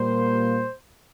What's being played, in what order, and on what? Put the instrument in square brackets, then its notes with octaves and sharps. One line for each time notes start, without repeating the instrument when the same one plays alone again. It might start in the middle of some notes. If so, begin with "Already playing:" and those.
Already playing: [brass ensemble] A#2 G3 A#3 C5